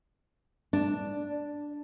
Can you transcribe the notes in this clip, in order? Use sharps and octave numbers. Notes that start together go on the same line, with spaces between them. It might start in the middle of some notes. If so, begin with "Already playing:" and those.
D4